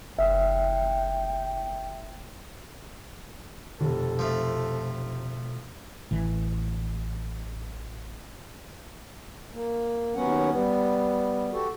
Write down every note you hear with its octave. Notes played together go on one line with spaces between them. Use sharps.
F#1 E5 G5
F1 B2 A4
F3 A3
A1 E3
A#3
D#2 F#3 B3 C#4 F#5
G3 B3
F#4 G4 A4